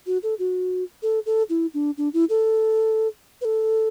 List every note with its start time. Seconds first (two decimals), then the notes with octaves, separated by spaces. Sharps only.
0.07 F#4
0.23 A4
0.39 F#4
1.03 A4
1.26 A4
1.50 E4
1.74 D4
1.98 D4
2.14 E4
2.30 A4
3.41 B4
3.45 A4